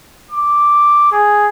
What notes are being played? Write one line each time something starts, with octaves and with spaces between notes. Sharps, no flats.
D6
G#4